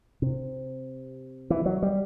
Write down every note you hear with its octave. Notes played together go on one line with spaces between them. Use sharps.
C3
E3
F#3
G3